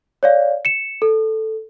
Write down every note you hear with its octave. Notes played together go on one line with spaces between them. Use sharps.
C#5 D5 F5
C#7 E7
A4